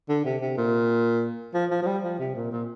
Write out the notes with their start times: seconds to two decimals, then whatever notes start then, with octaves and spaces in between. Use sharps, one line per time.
0.09 D3
0.25 C3
0.41 C3
0.57 A#2
1.54 F3
1.70 F3
1.82 F3
1.87 G3
2.03 F3
2.19 C3
2.35 A#2
2.52 A#2